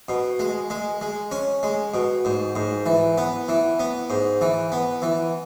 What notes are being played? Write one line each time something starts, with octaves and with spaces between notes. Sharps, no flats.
B2
G#3
G#3
G#3
C#4
G#3
B2
G#2
G#2
E3
B3
E3
B3
G#2
E3
B3
E3